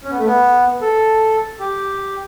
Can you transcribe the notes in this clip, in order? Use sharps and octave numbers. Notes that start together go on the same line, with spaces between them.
C#4
B3
A3
B3
A4
G4